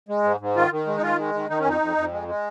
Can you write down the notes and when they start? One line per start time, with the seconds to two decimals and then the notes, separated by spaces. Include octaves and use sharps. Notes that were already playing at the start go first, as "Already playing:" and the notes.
0.09 G#3
0.24 G#2
0.40 G#2
0.56 D#3 F4
0.71 D#3
0.87 G#3
0.97 D#4
1.03 D#3 F4
1.18 G#3
1.34 D#3
1.49 D#3 D#4
1.59 C#4
1.65 F2 D#4
1.81 F2
1.97 F2
2.11 G#3
2.28 G#3